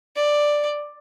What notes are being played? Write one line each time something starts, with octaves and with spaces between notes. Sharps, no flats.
D5